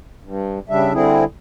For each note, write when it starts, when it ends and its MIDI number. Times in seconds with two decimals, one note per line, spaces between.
0.24 0.59 43
0.69 0.93 49
0.69 0.93 55
0.69 0.93 62
0.69 0.93 76
0.93 1.24 50
0.93 1.24 55
0.93 1.24 60
0.93 1.24 64
0.93 1.24 68